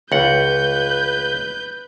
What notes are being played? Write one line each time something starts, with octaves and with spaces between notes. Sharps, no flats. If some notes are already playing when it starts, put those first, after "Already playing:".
C#2 B4 F#5 G6